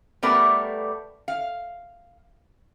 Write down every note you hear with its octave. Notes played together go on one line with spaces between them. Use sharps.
G3 A3 B3 A#4 B4 D5
F5